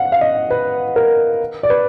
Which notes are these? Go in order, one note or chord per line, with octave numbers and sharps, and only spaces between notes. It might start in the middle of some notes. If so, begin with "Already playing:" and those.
Already playing: F5 F#5
F5
D#5
B4
A#4
D5
B4